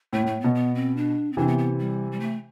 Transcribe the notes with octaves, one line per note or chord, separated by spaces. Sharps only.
A2 A3
A2
A3
B2 B3
B3
C4
D4
C4
C3 E3 D4
B3
B3
G3
G3
A3